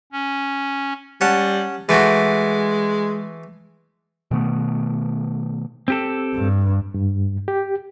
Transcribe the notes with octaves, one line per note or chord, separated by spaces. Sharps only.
C#4
G3 C#4 F#5 A5
E3 G#3 A3 F#4
B2 D#3 A3 B3
C4 G4 A4
G2
G2
G4